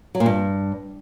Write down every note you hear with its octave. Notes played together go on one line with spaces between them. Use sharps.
F#3
A#2
G2